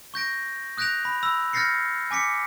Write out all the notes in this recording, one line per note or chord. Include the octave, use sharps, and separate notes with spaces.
C#6 G6 A#6 D7
D#6 F#6 G6 A#6 D7 F7
B5
B5 E6
F6 G6 A6 A#6 C7 C#7
G#5 D6 B6 C#7